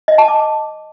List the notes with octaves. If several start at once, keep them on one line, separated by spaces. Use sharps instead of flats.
D#5
A5
D6